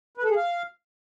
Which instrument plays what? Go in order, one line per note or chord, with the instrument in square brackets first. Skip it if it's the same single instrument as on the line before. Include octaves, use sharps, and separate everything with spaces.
[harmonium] B4
A4
G#4
F5